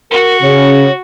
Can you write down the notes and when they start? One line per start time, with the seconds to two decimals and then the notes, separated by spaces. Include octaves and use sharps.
0.11 F#4 A#4
0.43 C#3 C#5